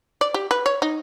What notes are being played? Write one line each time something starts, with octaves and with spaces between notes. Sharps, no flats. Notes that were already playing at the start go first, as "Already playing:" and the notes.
D5
G4
B4
C#5
D#4